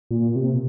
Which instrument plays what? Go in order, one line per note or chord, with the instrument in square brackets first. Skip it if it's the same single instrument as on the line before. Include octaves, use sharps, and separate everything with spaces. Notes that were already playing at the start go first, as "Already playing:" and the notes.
[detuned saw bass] A#2
C3